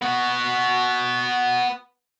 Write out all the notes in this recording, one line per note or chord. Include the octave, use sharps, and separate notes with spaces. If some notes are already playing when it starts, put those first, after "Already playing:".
B3 F#4